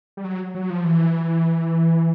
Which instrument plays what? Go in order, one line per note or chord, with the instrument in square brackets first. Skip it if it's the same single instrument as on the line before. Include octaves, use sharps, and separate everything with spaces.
[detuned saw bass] G3
F#3
F#3
F3
E3